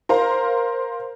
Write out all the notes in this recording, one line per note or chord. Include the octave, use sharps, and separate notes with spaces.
A#4 C5 F5 A#5